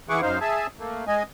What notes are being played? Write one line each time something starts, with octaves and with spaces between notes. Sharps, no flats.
E3 E4 G#4 F#5 C#6 D6
F#2 D#4 C5 F5
G#4 E5 G#5 A5
A3 A#3
G#3 D#5 G#5